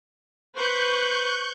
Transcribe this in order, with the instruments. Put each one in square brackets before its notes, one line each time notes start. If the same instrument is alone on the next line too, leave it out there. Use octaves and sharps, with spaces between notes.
[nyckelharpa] B4 C5 [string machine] C#6 F#6 G6